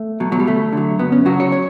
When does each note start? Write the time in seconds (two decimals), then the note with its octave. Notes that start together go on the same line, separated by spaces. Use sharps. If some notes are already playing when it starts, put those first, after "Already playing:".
Already playing: A3
0.20 B2 F#3
0.32 F#3
0.40 G3
0.47 D2 A3
0.73 D3 F#3
0.99 F#2 B3
1.12 C#4
1.25 C#3 F#3 F#4
1.40 C#5
1.52 C#5